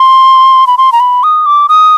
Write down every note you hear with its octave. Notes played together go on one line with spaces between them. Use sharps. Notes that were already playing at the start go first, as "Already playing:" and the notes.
Already playing: C6
B5
C6
A#5
B5
D#6
D6
D#6